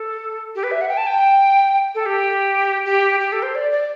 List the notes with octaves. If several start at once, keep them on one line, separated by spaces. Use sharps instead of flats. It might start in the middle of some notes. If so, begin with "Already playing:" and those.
Already playing: A4
G4
B4
E5
F#5
G5
A5
G5
A4
G4
G4
G4
A4
C5
D5
D5